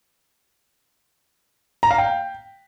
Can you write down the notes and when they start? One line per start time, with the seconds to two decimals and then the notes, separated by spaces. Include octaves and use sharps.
1.83 A#5
1.91 F5
1.98 G5